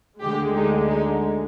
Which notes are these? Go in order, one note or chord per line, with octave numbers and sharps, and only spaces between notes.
D2 D3 G#3 G4
D#4
D#4